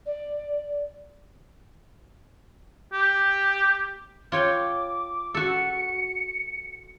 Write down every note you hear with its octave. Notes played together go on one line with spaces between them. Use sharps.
D5
G4
F4 C#5 G5 D6
F#4 A4 C#7